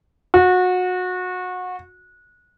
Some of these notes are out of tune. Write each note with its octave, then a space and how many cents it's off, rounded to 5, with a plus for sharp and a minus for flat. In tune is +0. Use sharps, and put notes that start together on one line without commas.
F#4 -25